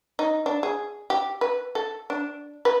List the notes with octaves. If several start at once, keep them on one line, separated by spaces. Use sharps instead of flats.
D#4
D4
G#4
G4
B4
A4
D4
B4